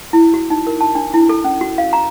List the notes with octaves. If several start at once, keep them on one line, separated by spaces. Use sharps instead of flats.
E4
F#4
D#4
A#4
A5
D4
E4
A4
C#4
F#4
F5
A#5